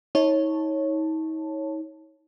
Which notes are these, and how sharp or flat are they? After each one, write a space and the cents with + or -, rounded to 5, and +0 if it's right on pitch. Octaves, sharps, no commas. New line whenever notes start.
D#4 +40 C#5 -10 A5 +0